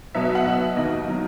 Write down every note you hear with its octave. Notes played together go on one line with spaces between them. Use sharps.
B2 F#3 B3 E5
E5
F#5
B2 F#3 B3 E5
D#2 D#3 F#3 D#5
D#3 F#3